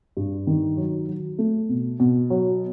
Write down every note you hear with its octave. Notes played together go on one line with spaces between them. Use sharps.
G2
D#3
F#3
F#3
A3
B2
B2
F#3